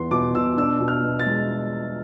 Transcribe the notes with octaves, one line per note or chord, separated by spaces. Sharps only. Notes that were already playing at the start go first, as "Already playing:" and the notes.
Already playing: E2 E3 B3 C6
B2 D6
B2 E6
D4 E6
B2
F6
B2
A6
G#3